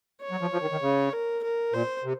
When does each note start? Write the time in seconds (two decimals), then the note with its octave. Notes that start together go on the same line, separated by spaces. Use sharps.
0.21 C#5
0.31 F#3
0.41 F3
0.53 F3
0.62 D#3
0.72 D#3
0.82 C#3
1.13 A#4
1.43 A#4
1.74 A#2 C5
2.04 C3